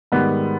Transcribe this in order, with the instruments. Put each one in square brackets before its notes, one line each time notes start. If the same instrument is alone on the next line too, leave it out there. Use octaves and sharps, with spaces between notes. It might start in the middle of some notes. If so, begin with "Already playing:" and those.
[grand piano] G#2 D#3 G3 B3